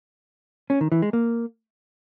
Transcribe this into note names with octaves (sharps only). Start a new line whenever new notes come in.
C#4
D#3
E3
G#3
A#3